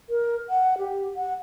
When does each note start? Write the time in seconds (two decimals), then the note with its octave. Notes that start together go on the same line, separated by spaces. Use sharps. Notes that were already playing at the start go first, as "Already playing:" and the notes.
0.10 A#4
0.50 F#5
0.78 G4
1.16 F#5